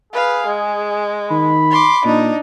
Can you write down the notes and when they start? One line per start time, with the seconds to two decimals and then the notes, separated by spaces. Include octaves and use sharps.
0.13 G#4 B4 F5
0.47 G#3
1.30 D#3 B5
1.70 C6 D6
2.05 A#2 D4 D#4